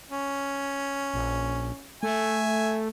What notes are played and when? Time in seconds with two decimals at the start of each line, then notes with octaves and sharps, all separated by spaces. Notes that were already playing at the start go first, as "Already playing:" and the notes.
0.10 C#4
1.14 A#1
2.03 A3 E5 G#5